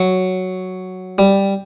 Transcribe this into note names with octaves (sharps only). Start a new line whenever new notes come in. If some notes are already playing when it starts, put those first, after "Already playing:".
Already playing: F#3
G3